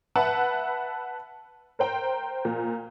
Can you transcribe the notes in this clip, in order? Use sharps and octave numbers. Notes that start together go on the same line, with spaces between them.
B4 E5 F#5 A5 B5
A#4 C5 G5 A#5
A#2